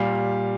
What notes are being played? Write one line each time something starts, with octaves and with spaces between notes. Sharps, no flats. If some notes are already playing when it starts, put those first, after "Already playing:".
Already playing: A#2 G3 F5